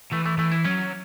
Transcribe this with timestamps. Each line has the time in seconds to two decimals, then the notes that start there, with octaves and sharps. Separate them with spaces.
0.12 E3 A3
0.26 A3
0.38 E3 A3
0.52 E4
0.65 F#3 C#4